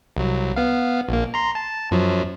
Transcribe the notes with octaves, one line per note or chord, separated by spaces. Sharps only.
C2 F#3
B3 F5
A#1 A#3
A#5 C6
A5
F#2 F3 F#3